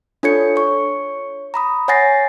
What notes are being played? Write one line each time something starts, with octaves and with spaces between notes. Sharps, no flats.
D4 F4 A4 C#5 G#6 C#7
C#5 C#6
A#5 B5 D#6
C#5 F#5 G#5 A6 A#6 C7